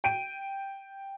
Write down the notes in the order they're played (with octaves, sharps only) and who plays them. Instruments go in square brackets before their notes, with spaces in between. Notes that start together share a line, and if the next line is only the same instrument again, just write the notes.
[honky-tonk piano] G5 D7 D#7